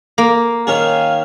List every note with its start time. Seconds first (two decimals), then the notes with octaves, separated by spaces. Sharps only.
0.18 A#3
0.67 D#3 C#4 G#4 F5